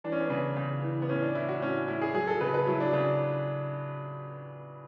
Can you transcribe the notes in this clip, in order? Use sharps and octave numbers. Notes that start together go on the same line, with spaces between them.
E3 D4
C#4
B3
C#3 C#4
C#3
E3
B3
A2 C#4
D4
E3 E4
F#4
A2 C#4
A2 E4
G#4
F#3 G#4
A4
C#3 B4
B4
F#3 E4
D4
C#3 D4